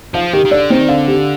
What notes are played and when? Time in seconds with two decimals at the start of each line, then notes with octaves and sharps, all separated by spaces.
0.14 F3 F5
0.33 D#3 G4
0.45 D#3
0.51 D3 D5
0.70 D#3 C4
0.89 D3 F5
1.08 G4